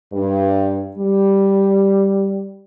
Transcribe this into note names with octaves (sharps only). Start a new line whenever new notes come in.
G2
G3